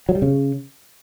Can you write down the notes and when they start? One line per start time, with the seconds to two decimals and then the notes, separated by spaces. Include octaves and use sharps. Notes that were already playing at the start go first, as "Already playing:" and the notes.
0.09 F#3
0.15 G3
0.22 C#3